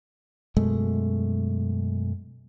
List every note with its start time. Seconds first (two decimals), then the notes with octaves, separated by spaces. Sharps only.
0.56 F#2 B2 G#3 A3